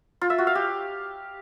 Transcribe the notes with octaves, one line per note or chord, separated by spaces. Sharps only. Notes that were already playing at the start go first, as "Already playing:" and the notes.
F4
E5
F#4
F5
G4